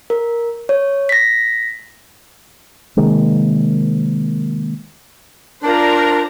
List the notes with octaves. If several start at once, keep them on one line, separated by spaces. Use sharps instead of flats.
A#4
C#5
A#6 B6
C3 D#3 G#3 A#3
D4 F4 A#4 C5 D5 A#5